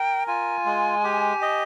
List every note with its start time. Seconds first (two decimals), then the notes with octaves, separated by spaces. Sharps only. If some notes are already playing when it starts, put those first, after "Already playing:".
Already playing: A#4 G5
0.27 F4 G#5
0.66 G#3
1.04 G4
1.42 D#5